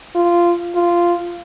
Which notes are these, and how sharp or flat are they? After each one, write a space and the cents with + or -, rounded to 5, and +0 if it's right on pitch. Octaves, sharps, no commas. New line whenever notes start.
F4 -15
F4 -10